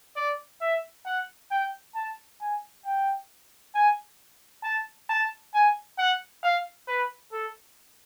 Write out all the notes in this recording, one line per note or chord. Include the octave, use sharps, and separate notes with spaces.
D5
E5
F#5
G5
A5
G#5
G5
G#5
A5
A5
G#5
F#5
F5
B4
A4